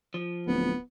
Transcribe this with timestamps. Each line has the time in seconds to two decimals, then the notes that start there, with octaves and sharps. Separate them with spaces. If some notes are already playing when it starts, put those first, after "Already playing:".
0.14 F3
0.47 D1 B3